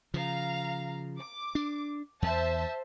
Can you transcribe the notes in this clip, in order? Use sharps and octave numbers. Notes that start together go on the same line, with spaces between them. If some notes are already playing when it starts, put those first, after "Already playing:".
C#3 F3 F5 A#5
D6
D4
E2 C5 E5 A5